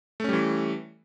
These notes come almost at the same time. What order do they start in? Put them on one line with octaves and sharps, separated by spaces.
A3 C#4 G3 E3